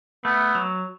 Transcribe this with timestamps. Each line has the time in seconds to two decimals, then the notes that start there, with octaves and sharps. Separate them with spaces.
0.25 A3 B3
0.55 F#3